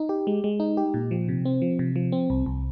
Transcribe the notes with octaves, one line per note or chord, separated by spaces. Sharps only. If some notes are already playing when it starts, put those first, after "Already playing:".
Already playing: D#4
G4
G#3
G#3
D#4
G4
A#2
F3
C3
C4
F3
C3
F3
C4
C2
C2